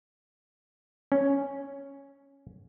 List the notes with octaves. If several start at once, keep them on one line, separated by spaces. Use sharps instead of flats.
C#4